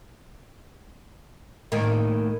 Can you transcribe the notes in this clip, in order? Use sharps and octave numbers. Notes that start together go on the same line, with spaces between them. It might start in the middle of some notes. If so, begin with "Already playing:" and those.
A2 D#3 A#3